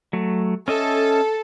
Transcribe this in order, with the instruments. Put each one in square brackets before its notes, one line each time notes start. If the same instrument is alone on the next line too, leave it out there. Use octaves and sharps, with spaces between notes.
[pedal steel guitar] F#3 A3
[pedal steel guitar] C#4 D#5 E5 [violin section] A4